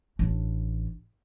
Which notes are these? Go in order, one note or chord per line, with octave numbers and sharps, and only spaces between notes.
A1 D4